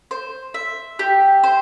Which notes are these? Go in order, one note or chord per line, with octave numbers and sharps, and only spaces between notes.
C5
E5
G4
C5